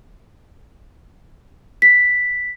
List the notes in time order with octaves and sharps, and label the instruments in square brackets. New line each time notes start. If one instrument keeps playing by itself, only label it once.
[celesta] B6